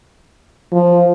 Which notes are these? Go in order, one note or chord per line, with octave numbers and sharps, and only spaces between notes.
F3